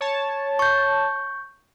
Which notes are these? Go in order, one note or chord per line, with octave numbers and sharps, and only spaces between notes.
C#5 A5
C#6 G6